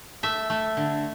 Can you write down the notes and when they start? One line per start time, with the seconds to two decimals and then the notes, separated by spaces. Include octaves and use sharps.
0.23 A3 E5
0.50 A3
0.77 D3